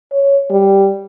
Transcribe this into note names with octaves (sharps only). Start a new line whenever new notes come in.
C#5
G3